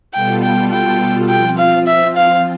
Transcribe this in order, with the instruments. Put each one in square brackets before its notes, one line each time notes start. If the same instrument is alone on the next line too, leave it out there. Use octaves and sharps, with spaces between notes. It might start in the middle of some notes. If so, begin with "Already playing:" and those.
[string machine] B2 G3 B3 F4 A4 [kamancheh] G5
[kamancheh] G5
G5
[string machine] F3 C4 F4 [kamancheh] G5
[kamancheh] F5
E5
F5